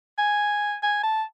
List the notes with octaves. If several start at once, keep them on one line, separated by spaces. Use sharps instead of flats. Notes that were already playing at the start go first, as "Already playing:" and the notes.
G#5
G#5
A5